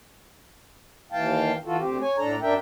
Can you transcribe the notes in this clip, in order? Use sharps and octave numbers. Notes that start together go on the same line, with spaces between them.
D#2 E3 F5 G5 A5
E3 F4 F#4 A4
D2 C4 G4
C#5 G#5
A2 D4 A4 A#5
F#2 D4 A#4 E5 G5